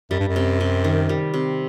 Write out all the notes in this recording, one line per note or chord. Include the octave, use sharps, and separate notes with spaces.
F#2 G3
G2
F#2
C3
C3
D#3
G3
C3